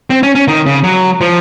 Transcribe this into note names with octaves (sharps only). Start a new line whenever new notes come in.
C4
C#4
C#4
D#3
C#3
F#3
F3